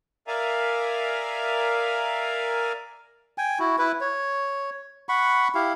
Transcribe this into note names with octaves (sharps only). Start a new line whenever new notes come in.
A#4 D5 E5 F5 G#5 A#5
G5 G#5
E4 F#4
E4 B4
C#5
F#5 B5 C#6
E4 G4 F5